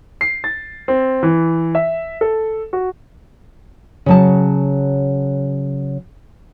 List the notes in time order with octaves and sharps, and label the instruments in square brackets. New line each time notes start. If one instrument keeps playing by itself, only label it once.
[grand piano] C7
A6
C4
E3
E5
A4
F#4
[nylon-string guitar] C#3 F#3 A5